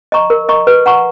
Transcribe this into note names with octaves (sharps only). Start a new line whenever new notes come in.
D#5 A#5 C#6
A#4
D#5 A#5 C#6
B4
F#5 A#5 C#6